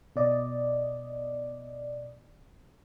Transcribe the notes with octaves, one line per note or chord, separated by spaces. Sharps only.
B2 D5 D#5